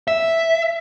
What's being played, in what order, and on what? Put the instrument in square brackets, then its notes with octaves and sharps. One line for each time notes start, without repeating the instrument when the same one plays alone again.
[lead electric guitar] E5